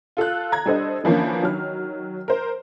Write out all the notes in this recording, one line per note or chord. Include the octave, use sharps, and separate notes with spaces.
F4 A4 F5 F#6
A#5 G#6
G3 D4 A4 C5 D#5
D3 E3 F3 A#3 C#4
D#3 F#3 F6
A#4 C5